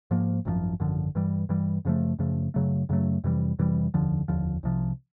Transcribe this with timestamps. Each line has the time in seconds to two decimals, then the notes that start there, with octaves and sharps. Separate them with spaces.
0.11 G#2 F3 A#3
0.45 G#1 F#2 D3 F3
0.80 G#1 F#2 D3 F3
1.15 G2 E3 G3
1.49 G2 E3 G3
1.85 F#2 C#3 F3 A3
2.19 F#2 C#3 F3 A3
2.54 F#2 C#3 F#3 A3
2.89 F#2 C#3 F#3 A3
3.24 F2 C3 E3 G3
3.59 F2 C3 E3 G3
3.94 F1 D#2 D3 F3
4.28 F1 D#2 D3 F3
4.63 C2 C3 F3